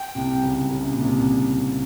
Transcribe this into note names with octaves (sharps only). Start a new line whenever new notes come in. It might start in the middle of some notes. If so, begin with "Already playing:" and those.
Already playing: G5
C2 C3
C#2 C#3
C#3
C3
A#2
C2 C3